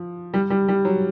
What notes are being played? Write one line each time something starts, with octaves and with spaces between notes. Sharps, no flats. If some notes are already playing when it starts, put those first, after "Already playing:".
Already playing: F3
G3
G3
G3
F#3